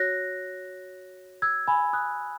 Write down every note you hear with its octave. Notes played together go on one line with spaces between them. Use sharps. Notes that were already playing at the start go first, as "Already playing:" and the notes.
Already playing: F#4 C#5 F#6 A#6
E6 G#6
G#5 B5
D#6 F#6